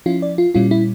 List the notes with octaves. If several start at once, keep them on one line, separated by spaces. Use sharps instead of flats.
F3 C#4 E4 F4
D5
F4
A#2 G3 C#4 E4 F4
E4